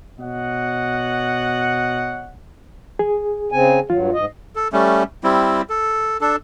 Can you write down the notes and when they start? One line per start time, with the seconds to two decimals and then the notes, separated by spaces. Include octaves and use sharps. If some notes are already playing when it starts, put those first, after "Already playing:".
0.19 B2 C#5 D#5 F#5
2.99 G#4
3.52 C#3 C4 G#5
3.90 G2 F#3 F4
4.13 G#2 D#5
4.56 A4
4.73 G3 A3 C#4
5.24 G3 C4 E4
5.69 A4
6.21 D4 A4